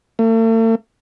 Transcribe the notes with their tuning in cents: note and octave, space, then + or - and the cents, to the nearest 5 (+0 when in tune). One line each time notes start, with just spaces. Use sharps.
A3 +45